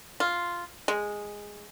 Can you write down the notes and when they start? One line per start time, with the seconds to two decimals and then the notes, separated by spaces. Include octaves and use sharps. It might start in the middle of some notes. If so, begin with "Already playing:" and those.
0.20 F4
0.88 G#3